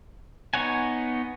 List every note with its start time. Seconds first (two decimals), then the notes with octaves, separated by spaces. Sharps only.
0.54 B3 D#4 C#5 F#5 G#5